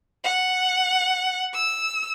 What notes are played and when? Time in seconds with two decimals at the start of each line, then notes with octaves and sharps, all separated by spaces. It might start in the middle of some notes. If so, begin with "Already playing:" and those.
0.24 F#5
1.54 E6